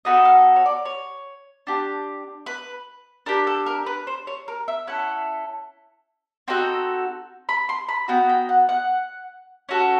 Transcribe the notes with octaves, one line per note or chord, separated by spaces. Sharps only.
B3 D#4 F#4 A4 D#5
F5
C#5
D5
C#5
D4 G4
B4
D4 G4 A#4
A4
A#4
B4
C5
C#5
A#4
E5
C#4 E4 A4 F#5
C4 D#4 F#4 A4 G5
B5
C6
B5
B3 D#4 F#4 G5
G5
F#5
F#5
C#4 F#4 A4